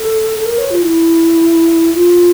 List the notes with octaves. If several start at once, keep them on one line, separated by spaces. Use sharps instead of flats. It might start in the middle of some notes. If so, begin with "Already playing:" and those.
Already playing: A4
A4
A#4
C#5
F4
E4
F4